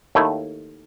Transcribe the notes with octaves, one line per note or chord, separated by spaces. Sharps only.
D#2 D#3 A3 E4